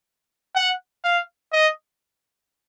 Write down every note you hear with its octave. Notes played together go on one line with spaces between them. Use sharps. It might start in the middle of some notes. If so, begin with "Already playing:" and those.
F#5
F5
D#5